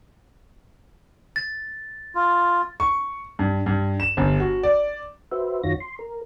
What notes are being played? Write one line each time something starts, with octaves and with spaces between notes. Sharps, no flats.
A6
F4
C#6
G2
G2
E7
G1
F#4
D5
F#4 B4 C5 E5
F#2 D#3 F4 F#4 C#5 A#6
C6
A#4